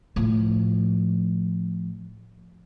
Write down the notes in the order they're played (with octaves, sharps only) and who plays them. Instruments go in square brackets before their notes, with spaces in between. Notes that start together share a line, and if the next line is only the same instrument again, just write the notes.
[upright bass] A2 F3